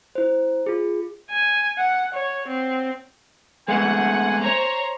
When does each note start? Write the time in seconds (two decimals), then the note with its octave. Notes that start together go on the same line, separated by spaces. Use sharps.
0.15 E4 C5
0.66 F4 G#4
1.30 G#5
1.78 F#5
2.14 C#5
2.48 C4
3.68 G#3 A3 B3 F#5 G#5
4.41 C5 C#5 A#5